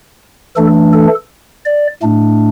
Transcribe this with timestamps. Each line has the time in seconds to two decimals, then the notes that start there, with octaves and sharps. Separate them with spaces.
0.56 E3 A3 D4 A4
0.93 A4
1.65 D5
2.02 A2 A3 D4